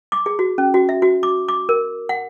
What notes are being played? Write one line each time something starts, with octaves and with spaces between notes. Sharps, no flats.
D6
G#4
F#4
C#4
F#4
E5
F#4
D6
D6
A#4
F#5